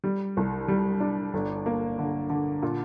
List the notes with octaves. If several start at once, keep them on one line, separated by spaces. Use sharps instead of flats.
G3
C2
G3
D4
G1
A#3
D3
D3
A#2